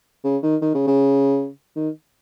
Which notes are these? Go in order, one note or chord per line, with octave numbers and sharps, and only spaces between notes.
C#3
D#3
D#3
C#3
C#3
D#3